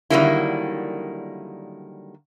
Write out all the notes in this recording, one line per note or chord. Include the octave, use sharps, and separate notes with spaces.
D3 D#3 F#3 G3 A#3 E4